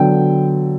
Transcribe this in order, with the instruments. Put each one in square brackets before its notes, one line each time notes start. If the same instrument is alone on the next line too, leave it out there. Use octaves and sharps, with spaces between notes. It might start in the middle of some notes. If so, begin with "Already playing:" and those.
Already playing: [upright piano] D3 F#3 B3 G5